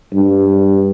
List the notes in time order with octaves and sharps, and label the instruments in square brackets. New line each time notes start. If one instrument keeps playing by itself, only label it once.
[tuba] G2